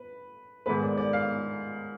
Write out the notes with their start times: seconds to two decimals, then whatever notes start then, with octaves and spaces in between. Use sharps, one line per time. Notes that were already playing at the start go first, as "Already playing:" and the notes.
Already playing: B4
0.66 G#2 D#3 G#3 B3 B4
0.82 D5
0.98 D5
1.13 F5